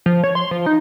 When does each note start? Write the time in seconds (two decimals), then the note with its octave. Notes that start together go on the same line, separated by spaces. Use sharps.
0.06 F3
0.24 C#5
0.35 C6
0.51 F3
0.66 D#4